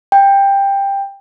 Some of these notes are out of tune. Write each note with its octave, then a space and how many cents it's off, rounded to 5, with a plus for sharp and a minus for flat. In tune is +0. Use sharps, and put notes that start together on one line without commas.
G5 +15